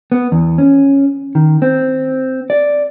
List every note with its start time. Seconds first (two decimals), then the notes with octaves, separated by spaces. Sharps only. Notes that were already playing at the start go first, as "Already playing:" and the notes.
0.12 B3
0.32 E2
0.58 C#4
1.35 D#3
1.62 C4
2.50 D5